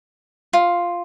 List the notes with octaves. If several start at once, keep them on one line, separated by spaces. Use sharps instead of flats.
F4